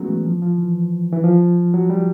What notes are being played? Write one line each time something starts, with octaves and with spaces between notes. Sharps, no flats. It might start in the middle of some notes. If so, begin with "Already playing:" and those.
Already playing: F#3 G#3 A3 B3 C#4
E3
F3
F3
E3
E3
F3
F#3
G3